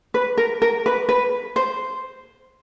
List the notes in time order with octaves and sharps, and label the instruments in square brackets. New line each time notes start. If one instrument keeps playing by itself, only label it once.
[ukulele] B4
A#4
A#4
B4
B4
C5